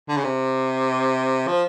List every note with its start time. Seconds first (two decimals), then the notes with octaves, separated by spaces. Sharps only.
0.09 D3
0.17 C#3
0.25 C3
1.47 F3